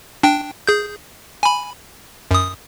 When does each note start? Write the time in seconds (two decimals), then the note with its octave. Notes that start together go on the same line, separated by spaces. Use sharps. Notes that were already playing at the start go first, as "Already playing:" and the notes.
0.23 D4 G5
0.67 G#4 G6
1.43 G#5 B5
2.31 F#2 D#6